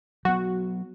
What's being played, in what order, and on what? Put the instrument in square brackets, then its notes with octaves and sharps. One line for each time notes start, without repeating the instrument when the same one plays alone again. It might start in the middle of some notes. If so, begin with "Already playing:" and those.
[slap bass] F#3 B3 [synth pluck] F#4